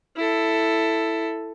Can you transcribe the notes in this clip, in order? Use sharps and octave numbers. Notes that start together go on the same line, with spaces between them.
E4 A4